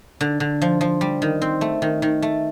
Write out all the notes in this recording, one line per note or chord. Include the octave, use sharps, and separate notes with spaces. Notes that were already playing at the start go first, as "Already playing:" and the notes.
D3
D3
F3
F3
G3
D#3
C4
A3
D#3
D#3
A3